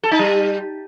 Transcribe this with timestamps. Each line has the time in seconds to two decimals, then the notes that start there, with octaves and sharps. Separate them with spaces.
0.03 A4
0.11 D#4
0.19 G3